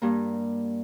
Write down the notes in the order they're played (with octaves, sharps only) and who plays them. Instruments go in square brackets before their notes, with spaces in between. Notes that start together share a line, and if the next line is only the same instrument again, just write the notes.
[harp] G2 G3 A#3